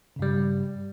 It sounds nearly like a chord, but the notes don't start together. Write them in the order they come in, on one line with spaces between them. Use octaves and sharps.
C#3 G2 G3